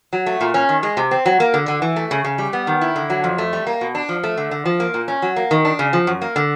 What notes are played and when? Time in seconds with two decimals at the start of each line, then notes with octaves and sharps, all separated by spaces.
0.13 F#3
0.26 A3
0.41 A#2
0.54 C#4
0.69 D#3
0.83 G#3
0.97 C3
1.11 C4
1.26 F#3
1.40 A#3
1.54 D3
1.68 D3
1.82 E3
1.96 A3
2.11 C#3
2.24 C#3
2.38 G3
2.53 B3
2.67 D#3
2.81 E4
2.96 D3
3.10 F#3
3.24 F2
3.38 A3
3.53 G3
3.67 A#3
3.81 B2
3.95 D4
4.09 F3
4.23 A3
4.37 D3
4.51 D3
4.65 F3
4.80 A#3
4.94 A#2
5.08 C#4
5.22 F#3
5.36 A#3
5.51 D#3
5.65 D4
5.79 C#3
5.93 F3
6.07 F#2
6.22 A#3
6.36 D3